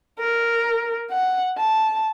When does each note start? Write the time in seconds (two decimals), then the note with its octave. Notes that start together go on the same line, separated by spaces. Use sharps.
0.20 A#4
1.11 F#5
1.58 A5